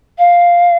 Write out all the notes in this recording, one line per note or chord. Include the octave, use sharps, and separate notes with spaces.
F5